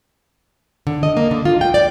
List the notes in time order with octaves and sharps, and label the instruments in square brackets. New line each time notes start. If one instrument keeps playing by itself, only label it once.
[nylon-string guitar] D3
D#5
A#3
D3
F4
G5
D5